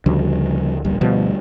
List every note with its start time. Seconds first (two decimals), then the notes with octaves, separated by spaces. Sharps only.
0.06 D2 C#3 F3 G3
0.85 D1 A#1 G3
1.01 D2 B2 F3 G3